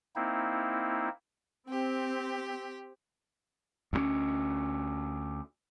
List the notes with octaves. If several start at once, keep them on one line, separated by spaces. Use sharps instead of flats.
A#3 C4 D#4 E4
C4 G4
D2 G3 C#4